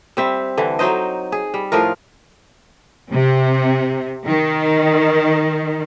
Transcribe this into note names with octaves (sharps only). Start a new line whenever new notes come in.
G3 C4 E5
D3 E3
F#3 D#4 C5 D#5
G#4
G3
A2 F3 F4 A#4
C3
D#3